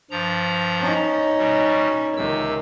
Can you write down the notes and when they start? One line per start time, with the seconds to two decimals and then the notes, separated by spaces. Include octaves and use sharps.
0.11 G2 F3 A#5
0.79 C#4 D#4
1.38 B2 G3
2.17 C#2 C3 D#3 E6